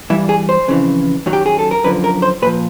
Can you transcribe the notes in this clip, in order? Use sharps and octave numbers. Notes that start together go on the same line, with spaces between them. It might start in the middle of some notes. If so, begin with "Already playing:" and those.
G2 E3 G3 E4
G#4
C5
F2 C#3 E3
F#2 D#3 F#3
G4
G#4
A4
A#4
F#2 D3 F3 B4
A#4
C5
A#2 F3 B4